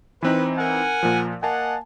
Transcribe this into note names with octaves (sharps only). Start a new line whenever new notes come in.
E3 C4 D#4 B4
A#4 F#5 G#5
A#2 F3
A#3 D#5 F#5 G#5 A5